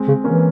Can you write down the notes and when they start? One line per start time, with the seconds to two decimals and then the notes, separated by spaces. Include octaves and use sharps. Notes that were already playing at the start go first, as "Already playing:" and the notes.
Already playing: G#3 C4
0.08 C#3
0.24 E3 A#3 C#4